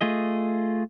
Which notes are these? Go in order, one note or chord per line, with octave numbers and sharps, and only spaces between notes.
A3 F4 G#4 D#5